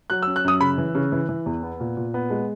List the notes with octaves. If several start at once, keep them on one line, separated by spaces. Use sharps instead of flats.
F#3 F#6
E6
C#4
F#6
F#2 D#6
C#3 B5
E3
C#3
E3
E3
E2
B3
A#2
A#2
B3
G#3